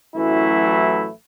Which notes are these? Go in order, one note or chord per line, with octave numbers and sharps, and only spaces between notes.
A1 F#2 E3 F#3 A3 E4